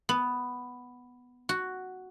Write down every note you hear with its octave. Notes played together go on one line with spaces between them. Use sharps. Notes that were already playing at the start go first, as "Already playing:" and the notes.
B3
F#4